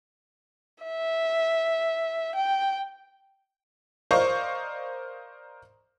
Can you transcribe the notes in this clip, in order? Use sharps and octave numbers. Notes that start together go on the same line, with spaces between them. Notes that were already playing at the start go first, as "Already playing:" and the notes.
E5
G5
A#4 C5 D5 D#5 F5 C#6